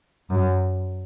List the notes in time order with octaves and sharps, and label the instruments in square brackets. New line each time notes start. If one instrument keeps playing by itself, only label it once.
[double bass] F#2